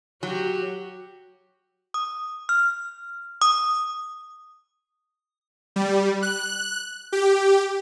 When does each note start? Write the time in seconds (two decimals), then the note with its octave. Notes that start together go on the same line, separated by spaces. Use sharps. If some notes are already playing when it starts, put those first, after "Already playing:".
0.23 F#3 F#4 G4
1.94 D#6
2.49 F6
3.42 D#6
5.76 G3
6.22 F#6
7.12 G4